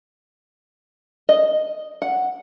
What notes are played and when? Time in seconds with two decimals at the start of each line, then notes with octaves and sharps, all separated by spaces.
1.29 D#5
2.02 F#5